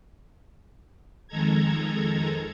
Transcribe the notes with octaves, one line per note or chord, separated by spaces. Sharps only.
F2 D#3 G#3 A4 A#5 G#6